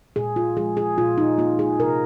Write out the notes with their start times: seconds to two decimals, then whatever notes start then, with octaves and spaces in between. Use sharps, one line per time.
0.16 A#2 G#4
0.36 F4
0.57 F3 G#3 G#4
0.77 G#4
0.97 A#2 F4
1.18 D#4
1.38 A#3 F4
1.59 G#4
1.80 C3 A#4